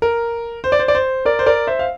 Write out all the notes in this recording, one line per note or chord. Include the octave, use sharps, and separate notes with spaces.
A#4
C5
D5
C5
D5
C5
A#4 D5
C5
A#4 D5
C5 E5
F5